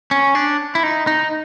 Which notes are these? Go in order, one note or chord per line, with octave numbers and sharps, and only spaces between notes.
C#4
D4
E4
D#4
D#4